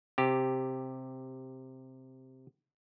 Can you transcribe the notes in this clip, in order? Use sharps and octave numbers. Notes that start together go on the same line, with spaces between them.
C3 G4